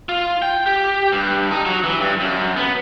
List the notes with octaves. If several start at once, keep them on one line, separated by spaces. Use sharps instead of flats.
F4
G5
G4
G2
D#4
F#3
E3
G2
F#2
B3